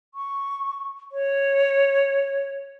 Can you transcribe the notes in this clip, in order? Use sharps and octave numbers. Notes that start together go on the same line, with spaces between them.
C#6
C#5